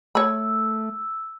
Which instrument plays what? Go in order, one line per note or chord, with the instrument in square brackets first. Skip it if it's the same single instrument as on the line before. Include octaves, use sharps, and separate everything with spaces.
[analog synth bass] A3 [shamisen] C#5 B5 [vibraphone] E6